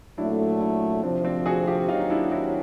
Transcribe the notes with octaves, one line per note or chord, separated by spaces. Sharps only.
A#2 F#3 A3 D4 E4
D4 E4
D2 C3 F3 C4 D4
C4 D4
F#4 G#4
F4 G4
D#2 D#3 F#3 D#4 F4
D#4
D4 E4
E4 F#4